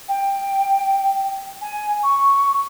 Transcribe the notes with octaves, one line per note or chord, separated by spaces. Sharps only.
G5
G#5
C#6